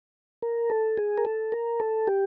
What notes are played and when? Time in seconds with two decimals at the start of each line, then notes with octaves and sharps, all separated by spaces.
0.42 A#4
0.70 A4
0.97 G#4
1.18 A#4
1.25 A4
1.52 A#4
1.80 A4
2.07 G4